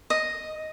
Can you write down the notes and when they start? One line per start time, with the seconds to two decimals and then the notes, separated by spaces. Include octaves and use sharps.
0.10 D#5